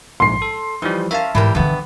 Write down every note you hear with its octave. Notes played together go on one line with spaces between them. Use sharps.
A#1 G#2 C6 C7
A4
E3 F3 G3 D#4
C#4 A#4 E5 F5 A5
G#2 E3 G3 A#4
G2 D3 E3 B3